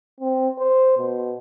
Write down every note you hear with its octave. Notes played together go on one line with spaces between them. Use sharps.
C4
C5
B2